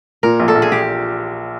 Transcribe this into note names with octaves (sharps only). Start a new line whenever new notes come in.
A#2 A#4
A#1
A4
A#1
G#4
G4